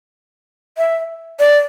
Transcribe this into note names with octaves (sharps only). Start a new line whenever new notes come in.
E5
D5